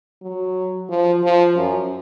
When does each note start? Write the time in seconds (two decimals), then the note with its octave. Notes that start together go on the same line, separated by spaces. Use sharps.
0.22 F#3
0.89 F3
1.23 F3
1.55 F#2